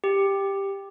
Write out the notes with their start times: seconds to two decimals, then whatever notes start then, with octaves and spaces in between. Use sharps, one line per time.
0.04 G4